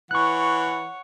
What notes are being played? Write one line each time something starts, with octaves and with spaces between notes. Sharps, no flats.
E3 C#5 F#5 C#6 F#6